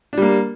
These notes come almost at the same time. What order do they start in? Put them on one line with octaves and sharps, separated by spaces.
D4 G3 A#3